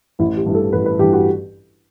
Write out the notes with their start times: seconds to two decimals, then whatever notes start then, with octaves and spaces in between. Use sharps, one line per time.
0.19 A1 E4
0.37 G4
0.46 G2 E3
0.55 A4
0.73 A1 B4
0.86 B4
0.99 G2 E3 G4
1.13 F#4